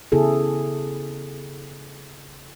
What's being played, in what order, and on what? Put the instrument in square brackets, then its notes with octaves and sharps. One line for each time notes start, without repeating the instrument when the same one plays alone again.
[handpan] C#3 B3 E4 G#4 A4